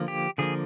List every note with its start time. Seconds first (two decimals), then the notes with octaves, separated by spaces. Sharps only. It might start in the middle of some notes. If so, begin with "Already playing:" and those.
Already playing: D3 F3 A#3
0.08 G4
0.38 D3 F3 A#3 G#4